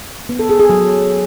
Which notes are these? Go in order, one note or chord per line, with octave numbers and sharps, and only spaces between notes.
B3
A4
G#4
G#4
F#3